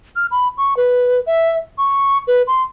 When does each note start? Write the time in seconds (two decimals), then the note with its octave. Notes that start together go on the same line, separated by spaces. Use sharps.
0.16 F6
0.31 B5
0.58 C#6
0.77 B4
1.27 E5
1.78 C#6
2.28 B4
2.47 C6